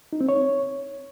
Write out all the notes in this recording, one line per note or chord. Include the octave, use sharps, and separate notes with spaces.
D#4
C4
C#5